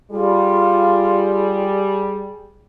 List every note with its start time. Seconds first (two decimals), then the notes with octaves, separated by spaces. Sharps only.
0.11 G3 F4 G#4